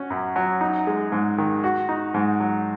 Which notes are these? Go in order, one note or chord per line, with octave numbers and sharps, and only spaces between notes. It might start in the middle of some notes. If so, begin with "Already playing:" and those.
Already playing: C#4 F#4
F#2
F#3
D#4
G#3
G#2
D#3
F#4
D#4
G#2
F#3